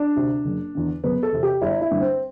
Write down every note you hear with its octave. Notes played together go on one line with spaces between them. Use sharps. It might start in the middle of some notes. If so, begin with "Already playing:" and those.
Already playing: D4
D2 C3
F#1
E2 D3
F#1 B3
A4
E2 C3
G4
G1 E4
E4
G2 D3
C4